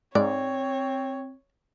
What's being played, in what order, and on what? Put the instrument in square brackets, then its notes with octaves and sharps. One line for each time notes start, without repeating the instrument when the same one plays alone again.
[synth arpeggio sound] G#2 [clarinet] C4 [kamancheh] C#5 [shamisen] D5